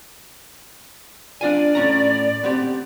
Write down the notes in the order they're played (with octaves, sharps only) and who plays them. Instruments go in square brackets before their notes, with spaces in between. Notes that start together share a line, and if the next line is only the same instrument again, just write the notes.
[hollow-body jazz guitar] D4 F4 G#5 [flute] D5
[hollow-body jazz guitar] A2 C#4 A#5
B3 C4 G4